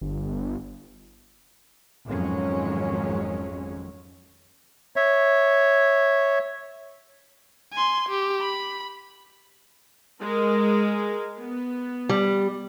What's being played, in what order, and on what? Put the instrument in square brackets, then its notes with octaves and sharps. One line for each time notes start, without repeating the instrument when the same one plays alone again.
[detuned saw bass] G1
[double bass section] G#1 F2 F#3 G#3 C#4
[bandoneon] C#5 E5
[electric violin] G#5 C6
G4
B5
[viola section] G#3 A#4
B3
[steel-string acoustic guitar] G3